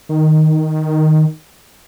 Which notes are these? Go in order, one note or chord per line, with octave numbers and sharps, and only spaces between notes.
D#3